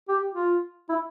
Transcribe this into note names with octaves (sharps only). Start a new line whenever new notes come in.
G4
F4
E4